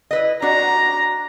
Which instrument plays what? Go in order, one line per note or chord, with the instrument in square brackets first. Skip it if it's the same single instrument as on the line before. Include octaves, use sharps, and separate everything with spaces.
[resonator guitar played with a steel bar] E4 B4 D#5
[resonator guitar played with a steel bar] D4 F#4 [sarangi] A#5